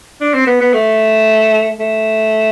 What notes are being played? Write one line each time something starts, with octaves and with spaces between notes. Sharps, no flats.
D4
C4
B3
B3
A3
A3